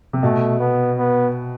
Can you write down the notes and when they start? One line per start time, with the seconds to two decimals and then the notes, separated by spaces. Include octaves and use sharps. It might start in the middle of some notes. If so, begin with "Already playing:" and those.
0.13 C3
0.23 B2 A3
0.59 B3
0.97 B3